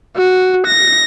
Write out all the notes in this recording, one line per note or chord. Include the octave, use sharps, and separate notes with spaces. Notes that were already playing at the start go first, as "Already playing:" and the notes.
F#4
A#6